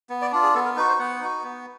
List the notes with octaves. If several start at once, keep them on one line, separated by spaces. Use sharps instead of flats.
B3
D5
D4 F4
G#4
B3 A4
A#4
D#4 F#4 B4
C5
B3 F#5
D#4 F#4
B3